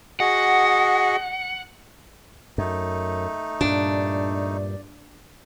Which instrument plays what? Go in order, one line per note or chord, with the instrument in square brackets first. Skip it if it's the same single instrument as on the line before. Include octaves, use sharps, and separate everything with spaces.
[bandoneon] F#4 G#4 D#5 [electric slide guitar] F#5
[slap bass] F#2 [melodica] A3 D#4
[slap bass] G2 A#2 [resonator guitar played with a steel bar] D4